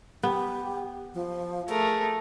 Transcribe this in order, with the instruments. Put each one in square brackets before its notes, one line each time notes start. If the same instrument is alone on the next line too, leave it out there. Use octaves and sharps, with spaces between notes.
[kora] B3 [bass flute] G4
[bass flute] F3
[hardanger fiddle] A3 A#4 [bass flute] G#4